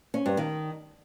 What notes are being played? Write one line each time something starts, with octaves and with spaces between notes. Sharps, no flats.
C#4
G2
D#3